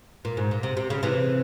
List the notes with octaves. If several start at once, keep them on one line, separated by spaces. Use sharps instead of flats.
A#2
G#2
A#2
C3
C3
C#3
C3 E3